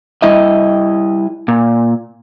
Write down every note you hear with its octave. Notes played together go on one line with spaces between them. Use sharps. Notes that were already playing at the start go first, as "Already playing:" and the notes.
G3 E4 D#5 E5
A#2